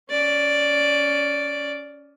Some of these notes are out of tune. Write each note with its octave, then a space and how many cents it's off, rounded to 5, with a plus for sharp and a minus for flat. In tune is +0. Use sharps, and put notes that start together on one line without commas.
C#4 +20 D5 +0